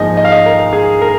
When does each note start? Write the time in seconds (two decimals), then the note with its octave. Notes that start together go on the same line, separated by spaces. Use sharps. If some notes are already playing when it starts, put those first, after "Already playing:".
Already playing: G#2 F3 A#3 D#4 D#5 G#5
0.17 D#5
0.25 F5
0.32 D#5
0.46 A#4
0.73 G#4
1.02 A#4